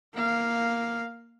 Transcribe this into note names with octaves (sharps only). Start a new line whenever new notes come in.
A#3 F5